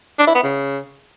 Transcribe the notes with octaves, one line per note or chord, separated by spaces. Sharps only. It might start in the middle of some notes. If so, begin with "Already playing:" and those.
D4
E4
B3
C#3